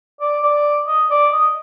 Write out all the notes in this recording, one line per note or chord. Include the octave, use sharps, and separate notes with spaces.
D5
D5
D#5
D5
D#5